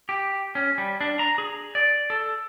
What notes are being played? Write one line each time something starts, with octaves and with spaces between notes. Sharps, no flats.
G4
C#4
G3
D4
A#5
G#4
D5
A4